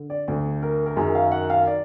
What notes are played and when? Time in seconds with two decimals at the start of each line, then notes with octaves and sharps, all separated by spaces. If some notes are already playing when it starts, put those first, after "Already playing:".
Already playing: D3
0.10 D5
0.28 D2 D3
0.62 A#4
0.86 A#4
0.97 F#2 D#3 G#4
1.15 F5
1.32 F#5
1.50 F5
1.67 D5